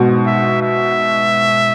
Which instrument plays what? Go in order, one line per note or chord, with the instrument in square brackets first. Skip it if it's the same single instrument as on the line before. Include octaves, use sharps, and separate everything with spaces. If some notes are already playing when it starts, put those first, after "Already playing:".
Already playing: [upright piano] G#2 B2
[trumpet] E5
E5